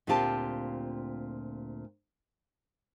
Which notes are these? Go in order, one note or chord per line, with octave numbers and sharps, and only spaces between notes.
D2 A#2 C4 F4 G4 A5